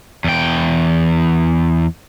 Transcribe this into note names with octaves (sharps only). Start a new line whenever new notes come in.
E2 G5